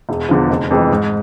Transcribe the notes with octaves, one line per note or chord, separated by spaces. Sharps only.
E1
E2 D3 F3
F1
F2 E3 G#3
G#2